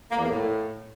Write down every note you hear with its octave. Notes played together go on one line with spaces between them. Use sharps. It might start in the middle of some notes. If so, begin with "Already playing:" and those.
A#3
E2
A#3
A2